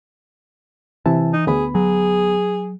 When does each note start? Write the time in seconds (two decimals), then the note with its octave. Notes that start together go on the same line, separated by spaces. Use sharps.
1.06 C3 E3 E4 A5
1.33 D#4
1.47 D2 B3 G#4 B5
1.75 F#3 G#4